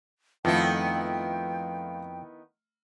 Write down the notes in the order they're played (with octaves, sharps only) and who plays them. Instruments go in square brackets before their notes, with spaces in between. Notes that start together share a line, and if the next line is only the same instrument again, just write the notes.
[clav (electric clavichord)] F2 [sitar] D#3 B3 E4 [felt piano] A3 F4 [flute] G5